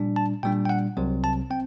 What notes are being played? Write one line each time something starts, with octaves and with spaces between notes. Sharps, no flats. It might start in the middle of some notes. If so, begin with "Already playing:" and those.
Already playing: A#2 G3 D4
A5
A#2 G3 D4 G5
G5
F#5
C2 C3 F#3 C4
A5
C4 G5